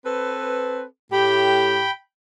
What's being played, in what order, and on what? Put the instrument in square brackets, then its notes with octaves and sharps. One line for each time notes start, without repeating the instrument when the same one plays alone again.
[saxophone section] C4 A4 B4
[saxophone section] A2 G4 [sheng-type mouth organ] G5 B5